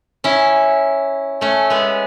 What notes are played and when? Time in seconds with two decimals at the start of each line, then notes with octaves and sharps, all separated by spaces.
0.24 C#4 E4
1.41 A3 C#4
1.70 G#3 B3